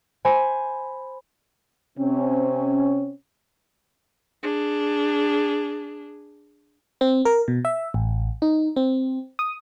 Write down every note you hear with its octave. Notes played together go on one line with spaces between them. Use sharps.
C5 G#5 B5
C3 C4 C#4
D4 G#4
C4
A#4
B2
E5
A1
D#4
C4
D#6